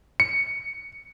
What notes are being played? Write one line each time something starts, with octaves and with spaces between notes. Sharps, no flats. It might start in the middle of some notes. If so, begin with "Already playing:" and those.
C#7